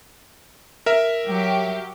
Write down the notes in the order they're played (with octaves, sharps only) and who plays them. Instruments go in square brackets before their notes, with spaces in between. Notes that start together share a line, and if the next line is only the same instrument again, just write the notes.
[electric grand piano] A#4 E5
[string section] F#3 G4